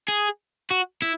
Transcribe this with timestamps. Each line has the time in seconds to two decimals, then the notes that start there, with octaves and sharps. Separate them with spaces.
0.08 G#4
0.71 F#4
1.02 E4